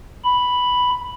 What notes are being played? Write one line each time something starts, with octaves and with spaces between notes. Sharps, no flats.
B5